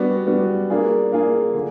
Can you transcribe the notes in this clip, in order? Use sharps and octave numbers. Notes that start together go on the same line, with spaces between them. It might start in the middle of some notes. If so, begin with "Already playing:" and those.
Already playing: G3 B3 D4 F#4
G3 B3 D4 F#4
A#3 D4 F4 G#4
A#3 D4 F4 G#4
D3